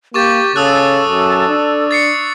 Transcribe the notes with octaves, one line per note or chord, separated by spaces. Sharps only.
A#3 G4 C#6 D6 A6
C#3 A4 D#6 E6 F#6
F#2
D4
A6 C7 C#7